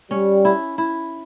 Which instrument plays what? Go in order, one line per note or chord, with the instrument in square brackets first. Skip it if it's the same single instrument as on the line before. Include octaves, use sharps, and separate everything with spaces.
[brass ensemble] G3 [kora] C#4
[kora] E4
E4